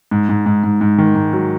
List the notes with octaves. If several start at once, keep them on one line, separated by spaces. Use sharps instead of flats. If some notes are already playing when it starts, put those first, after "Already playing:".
G#2
G#2
G#2
G#2
G#2
D#3
G#2
F#3